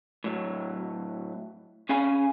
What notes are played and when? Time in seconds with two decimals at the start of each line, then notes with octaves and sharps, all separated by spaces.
0.24 A2 F#3
1.89 C#4 G#4 F5 G#5 B5